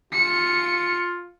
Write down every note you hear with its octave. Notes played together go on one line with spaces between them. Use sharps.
F4 C#7